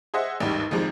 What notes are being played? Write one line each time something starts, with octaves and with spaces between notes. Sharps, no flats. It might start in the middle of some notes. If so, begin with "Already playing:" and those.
G#4 C5 D#5 E5 F#5
A1 D#2 G#2 D#3 G3
G#1 F2 G#2 F3 G#3